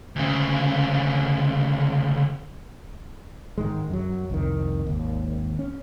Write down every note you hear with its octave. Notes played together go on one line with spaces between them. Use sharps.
D2 C#3
G#2 D#3 G#3
F#2 F#3
C2 F2 D#3
G#1 D#2
C#4